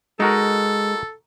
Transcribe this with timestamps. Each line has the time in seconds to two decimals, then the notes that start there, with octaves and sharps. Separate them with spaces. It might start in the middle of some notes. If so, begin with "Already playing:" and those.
0.20 G#3 D#4 F#4 A4 A#4